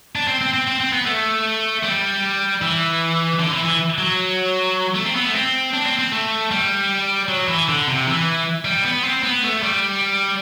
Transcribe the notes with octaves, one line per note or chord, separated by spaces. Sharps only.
D4
C4
C4
C4
C4
C4
B3
A3
G3
E3
D3
E3
E3
F#3
A3
C4
B3
A3
C4
D4
C4
C4
A3
G3
F#3
E3
D3
C3
E3
G3
B3
C4
B3
A3
G3